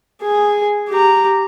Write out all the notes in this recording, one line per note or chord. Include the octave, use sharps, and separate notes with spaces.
G#4
G4 A#5